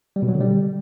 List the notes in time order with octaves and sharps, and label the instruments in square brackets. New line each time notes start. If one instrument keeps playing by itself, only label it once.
[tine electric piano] G3
B2
F#3
D3
G3